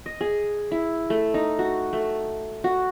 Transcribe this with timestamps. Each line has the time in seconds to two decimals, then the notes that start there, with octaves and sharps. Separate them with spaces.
0.06 D#5
0.21 G#4
0.71 E4
1.10 A3
1.34 D#4
1.59 F#4
1.93 A3
2.64 F#4